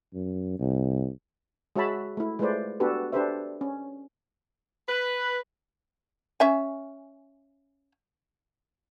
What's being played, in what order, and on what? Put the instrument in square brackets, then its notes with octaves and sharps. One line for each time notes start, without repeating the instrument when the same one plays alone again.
[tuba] F#2
C2
[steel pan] G#3 F#4 C#5 E5 A5 B5
A3 E4
G#3 A3 F4 B4 C5 D5
B3 D4 F#4 G4 A4 B4
D4 G4 A4 B4 C5 E5
C#4
[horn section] B4
[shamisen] C#4 E5 G#5